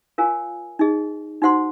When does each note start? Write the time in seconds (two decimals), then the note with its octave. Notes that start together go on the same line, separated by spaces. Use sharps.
0.18 F4 A#4 C#5 F5 G#5
0.79 D#4 G#4 D#5
1.42 D#4 F#4 C5 F#5 C6